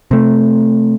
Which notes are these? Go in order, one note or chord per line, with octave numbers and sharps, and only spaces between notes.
C3 A3